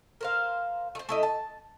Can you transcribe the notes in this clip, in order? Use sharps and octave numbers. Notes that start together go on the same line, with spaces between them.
A#4 C5 F5
A3 C5
A3 E4 D#5
A5